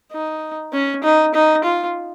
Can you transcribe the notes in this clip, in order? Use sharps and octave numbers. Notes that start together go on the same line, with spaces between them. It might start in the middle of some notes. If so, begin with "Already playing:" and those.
D#4
C#4
D#4
D#4
F4